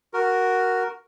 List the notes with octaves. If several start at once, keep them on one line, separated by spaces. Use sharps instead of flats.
F#4 A#4